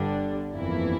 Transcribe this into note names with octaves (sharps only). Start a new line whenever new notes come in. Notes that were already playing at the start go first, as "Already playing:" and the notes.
Already playing: G1 G2 D3 G3 D4
G1 F2 E3 A#3 E4